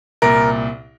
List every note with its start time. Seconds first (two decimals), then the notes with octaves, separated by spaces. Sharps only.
0.22 C2 A#2 A#4